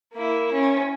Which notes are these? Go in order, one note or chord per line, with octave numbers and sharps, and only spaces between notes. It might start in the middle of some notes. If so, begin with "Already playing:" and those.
A#3 E4
C#4